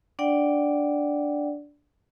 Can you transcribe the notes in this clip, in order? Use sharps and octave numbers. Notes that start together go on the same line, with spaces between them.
D4 D5 F#5 G5